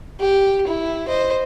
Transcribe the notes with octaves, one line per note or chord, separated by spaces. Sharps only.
G4
E4
C5 D#5